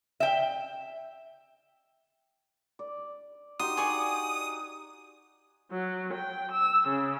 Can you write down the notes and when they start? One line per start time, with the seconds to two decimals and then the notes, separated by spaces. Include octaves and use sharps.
0.20 E5 G5
2.79 D5
3.60 D#4 F#4 G4 C6 D#6
3.77 G#4 D5 C#6
5.72 F#3
6.14 G5
6.52 E6
6.88 C#3